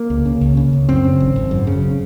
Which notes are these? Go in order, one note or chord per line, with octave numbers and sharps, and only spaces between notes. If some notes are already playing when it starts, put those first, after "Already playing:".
Already playing: A#3
C#2
C#3
C#2
C#3
C#2
F#2 C4
C#3
G#1
G#1
F#2
C#3